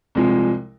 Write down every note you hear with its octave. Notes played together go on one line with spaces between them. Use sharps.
C2 C3 F3 G#3